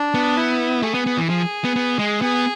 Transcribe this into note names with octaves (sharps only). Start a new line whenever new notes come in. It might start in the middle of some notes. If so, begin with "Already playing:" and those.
Already playing: D4
B3
E4
A3 G#4
B3
B3
E3
F3 G#4
B3
B3
G#3
B3 G#4